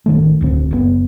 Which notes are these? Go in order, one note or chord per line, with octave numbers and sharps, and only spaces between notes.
A1 D#3 A3
D1 D2 C4
F#1 D3 B3